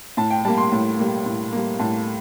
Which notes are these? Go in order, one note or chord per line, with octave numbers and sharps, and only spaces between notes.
A2 A5
G5
G3 A#3 A5
C6
A2
G3 A#3
A2
G3 A#3
A2 A5